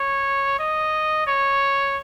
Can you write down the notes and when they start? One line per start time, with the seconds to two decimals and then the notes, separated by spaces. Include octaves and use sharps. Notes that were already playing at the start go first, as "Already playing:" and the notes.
Already playing: C#5
0.59 D#5
1.27 C#5